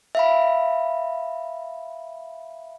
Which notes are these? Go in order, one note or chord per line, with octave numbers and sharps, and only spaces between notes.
E5 F5 B5